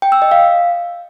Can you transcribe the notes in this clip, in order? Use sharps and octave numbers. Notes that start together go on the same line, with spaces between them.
G5
E6
D#5
F5